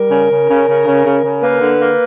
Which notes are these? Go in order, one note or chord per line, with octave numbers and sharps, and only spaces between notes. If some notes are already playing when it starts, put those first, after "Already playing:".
Already playing: G3 A#4
C#3
C#3
C#3
C#3
C#3
C#3
C#3
A#3 B4
D3
A#3